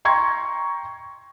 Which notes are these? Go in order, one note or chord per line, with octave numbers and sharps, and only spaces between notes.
G5 A#5 C6 C#6 G#6